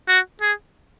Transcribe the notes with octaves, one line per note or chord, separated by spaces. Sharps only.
F#4
G#4